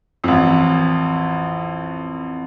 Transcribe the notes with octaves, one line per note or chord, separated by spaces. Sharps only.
A1 F2